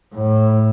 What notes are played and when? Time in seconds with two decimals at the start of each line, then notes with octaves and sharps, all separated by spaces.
0.15 A2